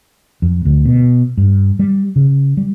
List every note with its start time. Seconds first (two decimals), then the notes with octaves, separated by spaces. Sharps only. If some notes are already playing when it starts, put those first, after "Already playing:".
0.42 F2
0.65 D2
0.85 B2
1.37 G2
1.79 G3
2.16 C#3
2.57 G3